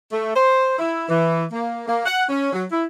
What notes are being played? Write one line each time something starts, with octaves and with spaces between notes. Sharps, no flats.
A3
C5
E4
E3
A#3
A#3
F#5
C#4
F#3
E4